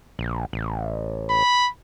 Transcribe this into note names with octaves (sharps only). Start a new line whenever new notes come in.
A#1
A1
B5